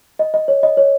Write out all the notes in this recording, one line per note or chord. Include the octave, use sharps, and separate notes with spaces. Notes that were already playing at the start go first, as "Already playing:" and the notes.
D#5
D#5
C#5
D#5
C#5